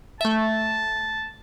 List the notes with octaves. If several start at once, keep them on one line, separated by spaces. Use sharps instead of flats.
A3 E5 A5